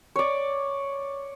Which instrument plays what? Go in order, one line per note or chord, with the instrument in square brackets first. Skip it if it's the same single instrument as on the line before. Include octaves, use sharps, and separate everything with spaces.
[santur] C#5 D5